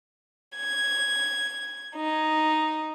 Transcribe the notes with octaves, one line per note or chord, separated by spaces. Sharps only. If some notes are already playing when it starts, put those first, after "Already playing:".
G#6
D#4